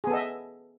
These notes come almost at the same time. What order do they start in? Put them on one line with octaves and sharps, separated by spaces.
G#4 B3 A4 D#5 E5